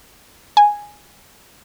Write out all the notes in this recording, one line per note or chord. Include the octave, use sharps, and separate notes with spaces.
G#5